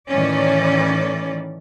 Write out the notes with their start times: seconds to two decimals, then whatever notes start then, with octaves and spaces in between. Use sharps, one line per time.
0.10 A2 D#3 E3 C#4 D5